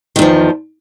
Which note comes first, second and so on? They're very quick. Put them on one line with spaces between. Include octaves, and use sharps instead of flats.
D#3 E2 F3